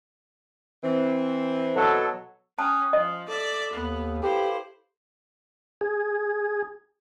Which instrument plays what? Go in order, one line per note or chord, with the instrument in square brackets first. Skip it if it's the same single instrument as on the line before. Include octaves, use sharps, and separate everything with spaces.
[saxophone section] E3 C4
[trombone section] B2 F#3 A4
[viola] C#4 [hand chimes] G5 D#6 F#6 [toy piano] A5
[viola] F3 [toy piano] D#5
[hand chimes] A4 [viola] D5 E5
[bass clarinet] D#2 [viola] B3
[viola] E4 C5 [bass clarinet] G4 [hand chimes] A4 B4 F5
[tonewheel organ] G#4